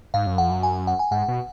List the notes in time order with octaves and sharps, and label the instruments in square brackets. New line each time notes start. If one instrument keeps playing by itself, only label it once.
[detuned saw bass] G#2 [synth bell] F5
[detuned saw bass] F#2
[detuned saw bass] F2 [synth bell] F#5
[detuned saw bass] F#2
[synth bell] G#5
F#5
G#5
[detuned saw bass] G#2 [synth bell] F#5
[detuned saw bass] B2